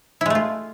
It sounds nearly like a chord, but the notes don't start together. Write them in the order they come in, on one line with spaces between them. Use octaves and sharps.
E4 G#3 A3 F4